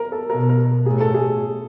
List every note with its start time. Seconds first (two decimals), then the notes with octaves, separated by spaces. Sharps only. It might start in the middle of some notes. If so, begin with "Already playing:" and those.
Already playing: A#4
0.12 A4
0.30 B2 A#4
0.49 A#4
0.86 A2 G#4
1.00 A4
1.14 G#4